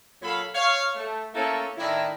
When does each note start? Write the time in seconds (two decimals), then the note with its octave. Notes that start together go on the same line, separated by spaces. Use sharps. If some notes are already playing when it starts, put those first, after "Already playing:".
0.22 A#2 F#3 A4 C#5 F5 B5
0.55 C#5 F5
0.96 A3
1.34 A3 A#3 C#4 E4 A4
1.77 A2 D#3 D4 E4